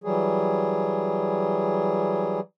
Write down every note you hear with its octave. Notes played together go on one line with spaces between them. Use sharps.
E3 F#3 G3 G#4